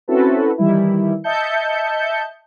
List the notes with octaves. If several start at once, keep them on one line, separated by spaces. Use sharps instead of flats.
C4 C#4 E4 F#4 A4 B4
D#3 E3 G3 E4
D#5 E5 A5 G6 C#7